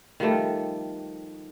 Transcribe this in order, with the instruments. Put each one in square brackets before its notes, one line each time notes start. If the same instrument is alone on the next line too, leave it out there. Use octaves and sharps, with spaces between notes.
[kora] D#3 F3 G3 A3